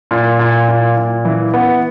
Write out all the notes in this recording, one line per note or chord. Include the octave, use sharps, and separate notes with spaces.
A#2
A#2
A#2
A#2
E3
B3